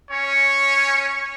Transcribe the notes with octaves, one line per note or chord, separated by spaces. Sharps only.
C#4 C#5